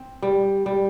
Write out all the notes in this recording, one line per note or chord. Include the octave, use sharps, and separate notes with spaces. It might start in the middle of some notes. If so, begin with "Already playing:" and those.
Already playing: C4
G3
G3